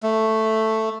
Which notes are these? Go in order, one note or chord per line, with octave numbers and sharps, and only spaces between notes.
A3